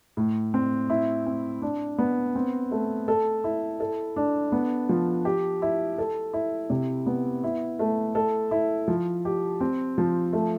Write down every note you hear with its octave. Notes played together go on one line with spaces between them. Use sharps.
A2
C4
E4
C4
D4
B3
C4
A3
A4
E4
A4
D4
B3
F3
G4
E4
A4
E4
C3
B3
E4
A3
A4
E4
F3
G4
C4
F3
A3